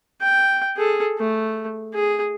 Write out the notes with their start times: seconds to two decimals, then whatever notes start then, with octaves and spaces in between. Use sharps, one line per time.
0.21 G5
0.77 G#4 A4
1.19 A3
1.94 G#4